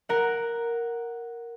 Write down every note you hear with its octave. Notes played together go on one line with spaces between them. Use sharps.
A#4 F#5